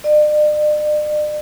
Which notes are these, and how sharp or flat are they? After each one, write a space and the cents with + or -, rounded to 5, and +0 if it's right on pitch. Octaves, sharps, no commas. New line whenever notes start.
D5 +45